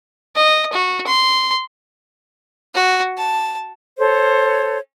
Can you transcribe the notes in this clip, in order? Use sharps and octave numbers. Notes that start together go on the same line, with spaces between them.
D#5
F#4
C6
F#4
A5
A4 C5 C#5